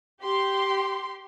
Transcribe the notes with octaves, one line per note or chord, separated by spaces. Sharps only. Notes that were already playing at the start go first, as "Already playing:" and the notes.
G4 C6